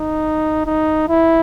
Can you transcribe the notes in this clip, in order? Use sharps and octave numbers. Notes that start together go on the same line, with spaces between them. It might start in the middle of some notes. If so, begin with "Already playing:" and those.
Already playing: D#4
D#4
E4